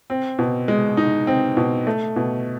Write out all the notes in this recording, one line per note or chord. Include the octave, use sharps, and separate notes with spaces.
C4
B2
G#3
D#4
C4
B2
A3
B2